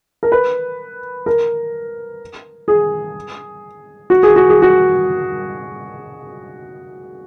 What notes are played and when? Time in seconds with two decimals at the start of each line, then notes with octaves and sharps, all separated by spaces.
0.23 A#4
0.32 B4
1.26 A#4
2.68 G#4
4.10 F#4
4.23 G#4
4.36 F#4
4.49 G#4
4.62 F#4